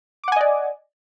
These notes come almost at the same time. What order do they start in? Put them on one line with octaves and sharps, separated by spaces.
D6 F#5 G#5 D#5 D5